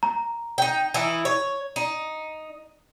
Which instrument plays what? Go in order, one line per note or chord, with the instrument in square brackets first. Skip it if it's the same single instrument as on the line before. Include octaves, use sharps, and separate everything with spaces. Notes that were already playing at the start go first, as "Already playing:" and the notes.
[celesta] A#5
[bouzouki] D#4 G5
E3 D#4 E4
C#5
D#4